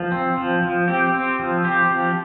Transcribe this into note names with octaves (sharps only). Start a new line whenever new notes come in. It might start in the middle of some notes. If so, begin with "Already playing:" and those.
Already playing: F3
C4
F3
F3
C4 G4
C4
F3
C4 G4
F3